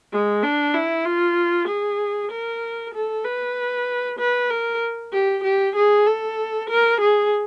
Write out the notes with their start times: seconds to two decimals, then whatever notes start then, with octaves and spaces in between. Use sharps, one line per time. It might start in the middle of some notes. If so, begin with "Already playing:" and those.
0.12 G#3
0.44 D4
0.74 E4
1.05 F4
1.68 G#4
2.31 A#4
2.94 A4
3.25 B4
4.19 B4
4.50 A#4
5.13 G4
5.44 G4
5.76 G#4
6.07 A4
6.70 A#4
7.01 G#4